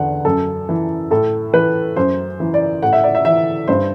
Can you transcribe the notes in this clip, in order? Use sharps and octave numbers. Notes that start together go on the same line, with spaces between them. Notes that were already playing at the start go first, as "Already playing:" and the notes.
Already playing: E2 D3 F#5
F#2 A4
E3
A2 A4
E3 B4
F#2 C5
E3
D5
A2 F#5
E5
D5
E5
E3 E5
G2 C5